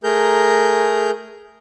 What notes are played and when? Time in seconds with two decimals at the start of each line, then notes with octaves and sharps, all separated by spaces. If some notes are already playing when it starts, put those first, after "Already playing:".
0.04 A3 G#4 A#4 A#5 G6